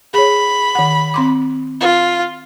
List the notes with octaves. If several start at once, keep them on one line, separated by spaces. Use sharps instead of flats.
G#4 C#5 B5
D#3 F#5
C4 C6 D6
F4